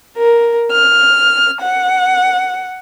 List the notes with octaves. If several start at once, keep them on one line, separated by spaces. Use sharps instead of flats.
A#4
F6
F#5